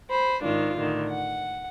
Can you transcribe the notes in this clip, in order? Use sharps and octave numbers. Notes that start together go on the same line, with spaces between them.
C5 B5
G#2 D#3 D4 F4
A2 D3 D#3
F#5